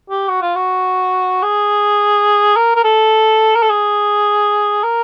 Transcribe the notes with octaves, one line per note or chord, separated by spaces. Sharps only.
G4
F#4
F4
F#4
G#4
A#4
A#4
A4
A#4
A4
G#4
A#4